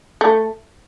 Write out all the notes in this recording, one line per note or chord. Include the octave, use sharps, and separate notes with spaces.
A3